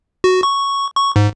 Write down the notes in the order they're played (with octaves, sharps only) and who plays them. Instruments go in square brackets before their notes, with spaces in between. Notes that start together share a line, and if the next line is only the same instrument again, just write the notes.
[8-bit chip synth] F#4
C#6
C#6
G#2